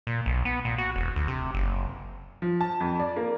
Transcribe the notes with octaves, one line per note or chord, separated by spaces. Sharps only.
A#2
B1
B3
A#2
F#4
E1
D2
C3
F#1
F3
A5
F2
D5
A#3